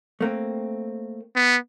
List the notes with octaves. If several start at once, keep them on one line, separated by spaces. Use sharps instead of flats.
A3 A#3 C4
B3